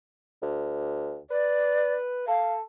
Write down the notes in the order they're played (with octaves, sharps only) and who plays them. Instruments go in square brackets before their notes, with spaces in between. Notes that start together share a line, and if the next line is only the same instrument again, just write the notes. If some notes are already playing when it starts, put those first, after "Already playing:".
[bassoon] D2
[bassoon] B4 [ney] D5
[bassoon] A4 [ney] F5